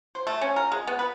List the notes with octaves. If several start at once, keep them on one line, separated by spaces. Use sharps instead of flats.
C5
A3
C#4
A#4
G#3
B3
B4